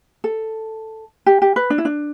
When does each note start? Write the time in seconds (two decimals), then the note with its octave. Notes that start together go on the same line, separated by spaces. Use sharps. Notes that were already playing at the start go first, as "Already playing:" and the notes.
0.24 A4
1.26 G4
1.42 G4
1.56 B4
1.70 D4
1.78 E4
1.85 D4